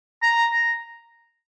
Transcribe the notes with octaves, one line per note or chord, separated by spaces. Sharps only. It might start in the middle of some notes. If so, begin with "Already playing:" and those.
A#5